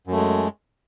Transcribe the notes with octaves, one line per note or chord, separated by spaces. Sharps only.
F#2 G#3 A3